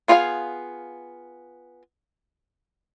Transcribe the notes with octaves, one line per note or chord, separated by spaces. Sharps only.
B3 F4 G#4 C#5 F5